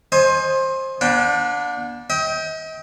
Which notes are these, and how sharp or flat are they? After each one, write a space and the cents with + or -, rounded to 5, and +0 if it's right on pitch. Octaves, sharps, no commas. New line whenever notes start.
C5 +20 D#5 +0 G#5 +20
B3 -45 D4 +0 G5 +0
D#5 +40 G5 +0